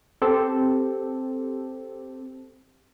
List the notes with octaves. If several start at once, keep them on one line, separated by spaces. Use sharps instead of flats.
C4 G4 A4